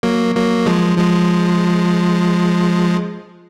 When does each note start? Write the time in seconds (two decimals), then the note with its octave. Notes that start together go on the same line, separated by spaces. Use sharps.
0.03 F#3 A#3
0.35 F#3 A#3
0.66 F3 G#3
0.97 F3 G#3